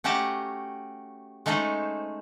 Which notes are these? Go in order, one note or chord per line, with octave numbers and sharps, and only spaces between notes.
A3 C#4 F#4 G4 A5 A#5
G#3 A3 C#4 D#4 A4 C5